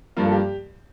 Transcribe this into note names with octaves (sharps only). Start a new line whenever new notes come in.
G2 F3 A#3 F4
A4
G4